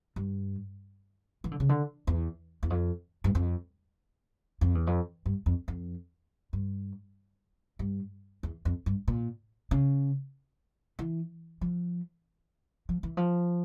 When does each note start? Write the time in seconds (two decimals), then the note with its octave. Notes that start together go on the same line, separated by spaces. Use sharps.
0.16 G2
1.44 E3
1.51 D3
1.60 C#3
1.69 D3
2.07 E2
2.63 E2
2.70 F2
3.24 G2
3.35 F2
4.61 F2
4.75 E2
4.87 F2
5.26 G2
5.46 F2
5.68 F2
6.53 G2
7.79 G2
8.43 E2
8.65 F2
8.86 G2
9.08 A#2
9.71 C#3
10.99 E3
11.61 F3
12.89 F3
13.03 E3
13.17 F3